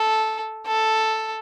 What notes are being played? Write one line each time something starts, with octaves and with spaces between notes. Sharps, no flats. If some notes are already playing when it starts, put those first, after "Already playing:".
Already playing: A4
A4